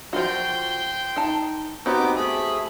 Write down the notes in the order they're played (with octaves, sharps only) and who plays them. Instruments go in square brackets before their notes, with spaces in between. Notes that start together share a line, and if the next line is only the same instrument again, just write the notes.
[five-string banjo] F3 F4 F#4 [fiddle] G5 C6
[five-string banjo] D#4 A5
[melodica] B3 D#4 [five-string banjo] C4 F#4 G4 [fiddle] D6
[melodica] A3 G#4 [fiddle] B5